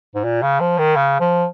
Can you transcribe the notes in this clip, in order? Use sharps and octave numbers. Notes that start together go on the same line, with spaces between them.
G#2
A#2
C#3
F3
D#3
C#3
F3